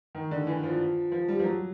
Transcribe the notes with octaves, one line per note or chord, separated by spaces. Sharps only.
D#3
D3
E3
F3
F3
G3
F3
F#3